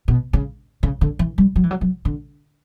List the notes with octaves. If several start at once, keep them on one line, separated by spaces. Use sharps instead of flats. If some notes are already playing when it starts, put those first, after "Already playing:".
B2
C#3
C#3
D3
E3
G3
F#3
E3
F#3
F#3
D3